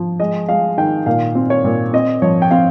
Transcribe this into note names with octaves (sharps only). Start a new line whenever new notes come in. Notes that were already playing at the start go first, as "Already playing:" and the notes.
Already playing: F3
G#3 D#5
G#3 F5
D#3 G5
A#2 F5
C4
C#5
A#2
C4 D#5
F3 C#5
G5
C4 F5